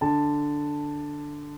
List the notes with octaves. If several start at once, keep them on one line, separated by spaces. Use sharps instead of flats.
D3 A5